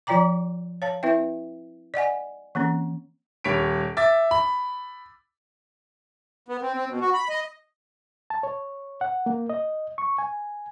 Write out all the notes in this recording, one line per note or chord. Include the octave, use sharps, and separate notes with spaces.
F3 F4 D5 G5 A#5 D6
C#5 F5 A5
C4 E4 B4 E5 G5
D5 D#5 F#5 G#5
E3 A#3 C4 C#4
D#1 G3 C#5 B6 D7
E5 D6 A6
B5
B3
C4
C4
B2
F#4
B5
D#5
A5
C#5
F#5
A#3
D#5
C#6
G#5